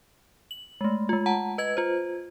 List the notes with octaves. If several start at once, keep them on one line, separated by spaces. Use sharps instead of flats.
F#7
G#3 A3
G#3 F4
F#5 A5 A#5
B4 D#5 G#6
F4 C5